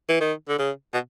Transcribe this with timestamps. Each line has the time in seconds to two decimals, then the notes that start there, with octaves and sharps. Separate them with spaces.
0.09 E3
0.21 D#3
0.49 D3
0.59 C#3
0.94 B2